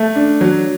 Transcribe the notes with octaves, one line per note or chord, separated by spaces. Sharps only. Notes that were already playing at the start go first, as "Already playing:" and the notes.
Already playing: A3
D4
F#3